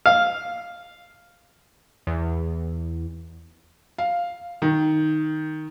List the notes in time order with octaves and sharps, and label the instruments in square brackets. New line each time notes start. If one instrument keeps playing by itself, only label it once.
[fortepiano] F5
[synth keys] E2
[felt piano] F5
D#3